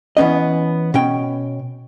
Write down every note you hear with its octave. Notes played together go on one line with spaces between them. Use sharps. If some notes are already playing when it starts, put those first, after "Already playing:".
E3 B3 C#4 D#5
B2 C#4 G5